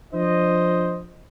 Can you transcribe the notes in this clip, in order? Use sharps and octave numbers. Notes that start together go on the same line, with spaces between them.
F3 D4 C5 D#5